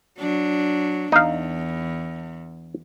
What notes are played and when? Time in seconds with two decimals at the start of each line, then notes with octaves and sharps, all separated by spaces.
0.19 F#3 D4
1.12 E2 D#4 F5